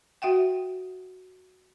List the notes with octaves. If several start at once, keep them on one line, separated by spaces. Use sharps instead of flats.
F#4 E5 F#5 G5